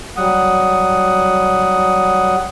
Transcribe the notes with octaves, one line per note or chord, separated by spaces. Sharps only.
F#3 G3 F#5 D#6